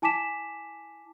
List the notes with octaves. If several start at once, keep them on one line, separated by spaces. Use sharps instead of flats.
E4 G#5 A5 D6 B6 E7